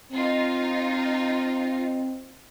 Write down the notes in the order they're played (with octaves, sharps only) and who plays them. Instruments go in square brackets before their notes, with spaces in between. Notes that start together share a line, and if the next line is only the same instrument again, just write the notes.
[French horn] C4 [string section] D#4 F4